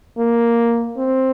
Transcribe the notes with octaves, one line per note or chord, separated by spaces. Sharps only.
A#3
C4